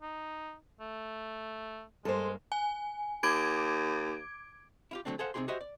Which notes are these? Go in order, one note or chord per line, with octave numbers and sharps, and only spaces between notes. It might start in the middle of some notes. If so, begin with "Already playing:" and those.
D#4
A3
G2 G#3 A#3 A4 C5
G#5
D#2 D6 G#6 D7
E4 F4 G4
D3 E3 F#3 A3 C4 D4
G#4 A4 C5 F5 F#5
C3 C4 D#4 G4 G#4 C6
F#4 G4 C5 D#5 E5
D5